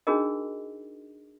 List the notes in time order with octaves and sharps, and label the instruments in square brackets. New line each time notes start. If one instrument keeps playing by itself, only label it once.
[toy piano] D4 D#4 F#4 G#4 A#4 D#5